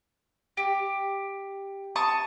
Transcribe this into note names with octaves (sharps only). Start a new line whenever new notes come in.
G4
A5 C#6 D#6